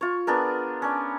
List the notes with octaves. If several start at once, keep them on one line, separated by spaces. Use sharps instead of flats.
F4 C#5
B3 D4 G#4 A#4
C#4 D4